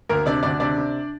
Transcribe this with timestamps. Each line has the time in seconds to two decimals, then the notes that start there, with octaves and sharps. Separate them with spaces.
0.09 D2 A#3 A#4
0.26 C3 D4 D5
0.43 D2 D4 D5
0.60 C3 D4 D5
0.78 C3